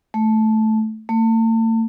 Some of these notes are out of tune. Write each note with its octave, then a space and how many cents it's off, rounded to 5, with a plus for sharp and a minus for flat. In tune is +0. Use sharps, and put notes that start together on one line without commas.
A3 -10
A3 +40